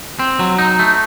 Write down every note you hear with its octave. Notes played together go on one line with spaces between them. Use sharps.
C4
F#3
D#4
A3